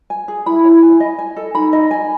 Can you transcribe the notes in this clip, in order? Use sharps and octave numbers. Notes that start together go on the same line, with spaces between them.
G#5
G#4
E4 B5
C#5
G#5
D#5
G#5
A4
D#4 B5
D#5
G#5